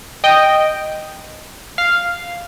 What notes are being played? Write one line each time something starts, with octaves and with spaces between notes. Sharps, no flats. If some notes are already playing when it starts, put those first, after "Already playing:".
D#5 G5
F5